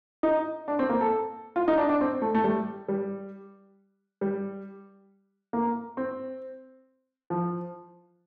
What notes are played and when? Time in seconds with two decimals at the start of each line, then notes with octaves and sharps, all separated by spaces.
0.23 D#4
0.68 D4
0.79 C4
0.89 A#3
1.01 A4
1.56 F4
1.68 D#4
1.78 D4
1.89 D4
2.01 C4
2.22 A3
2.35 A3
2.44 G3
2.88 G3
4.21 G3
5.53 A#3
5.97 C4
7.30 F3